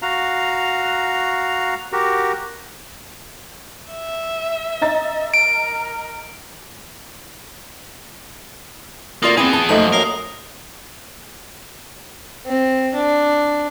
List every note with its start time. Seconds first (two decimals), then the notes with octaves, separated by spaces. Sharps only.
0.02 F#4 F5 A#5
1.92 F#4 G4 A#4
3.91 E5
4.81 D#5 A#5 A6
5.34 A#4 D7
9.22 D2 A#3 F4 D5 D#6
9.37 B3 C4 E4 G#4 D#6
9.53 A5
9.69 F#2 F3 A3 A#3 D#4 F#7
9.92 F#2 A#4 D#6 C7 G7
12.47 C4
12.95 D4